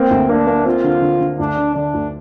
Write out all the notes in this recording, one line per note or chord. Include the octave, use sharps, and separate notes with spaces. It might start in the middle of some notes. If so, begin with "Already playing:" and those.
Already playing: A#3 C4
D2
A#3 D4
A#3
C4 F4
D3
D3
D3
D2 D4
D3
D3 D4
D2